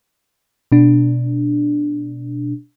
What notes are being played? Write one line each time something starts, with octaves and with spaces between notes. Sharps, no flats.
B2 D4